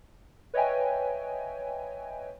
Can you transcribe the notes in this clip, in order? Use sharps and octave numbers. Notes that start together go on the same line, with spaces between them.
B4 C#5 D#5 E5 G5 G#5